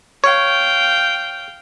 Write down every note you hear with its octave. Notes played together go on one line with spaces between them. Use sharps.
C#5 F5 G5